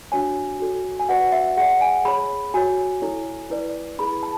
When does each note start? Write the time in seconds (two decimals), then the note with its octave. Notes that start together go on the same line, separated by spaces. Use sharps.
0.12 D4 F#4 C#5 G#5
0.60 F#4 A4 C#5
1.00 G#5
1.09 F#4 B4 D5 F#5
1.32 E5
1.57 G#4 D5 F#5
1.81 G#5
2.05 G#4 C#5 B5
2.54 F#4 C#5 G#5
3.02 E4 A4 C#5
3.50 E4 B4 D5
3.99 E4 G#4 B4 B5
4.23 A5